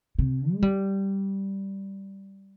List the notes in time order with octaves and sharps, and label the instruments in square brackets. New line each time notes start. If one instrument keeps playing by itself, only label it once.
[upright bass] C3
G#3
G3